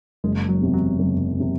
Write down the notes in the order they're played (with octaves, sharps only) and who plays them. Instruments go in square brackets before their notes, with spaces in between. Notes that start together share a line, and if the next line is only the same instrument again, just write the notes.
[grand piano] F#1 [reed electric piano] G#3
[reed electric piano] F#3
[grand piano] E2 C3
[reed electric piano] F#3
[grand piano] F#1
C3